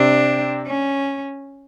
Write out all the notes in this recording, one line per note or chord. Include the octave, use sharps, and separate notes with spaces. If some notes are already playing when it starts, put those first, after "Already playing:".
Already playing: C3 C4 D4
C#4